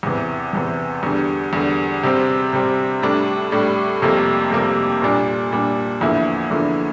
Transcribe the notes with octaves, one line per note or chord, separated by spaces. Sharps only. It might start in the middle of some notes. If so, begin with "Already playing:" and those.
E2 C3 E3
E2 C3 E3
E2 D3 G3
E2 D3 G3
C3 G3 C4
C3 G3 C4
A2 G3 D4
A2 G3 D4
F2 C3 G3 A#3
F2 C3 G3 A#3
A#2 G3 D4
A#2 G3 D4
E2 D3 F3 A#3 E4
E2 D3 F3 A#3 E4